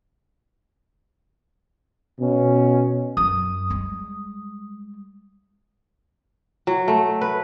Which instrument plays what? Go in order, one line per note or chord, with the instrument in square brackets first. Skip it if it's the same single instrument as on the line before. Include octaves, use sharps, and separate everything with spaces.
[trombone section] B2 C#4
[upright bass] F#2 [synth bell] D#6
[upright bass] G3 G#3
[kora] F#3
A3
B4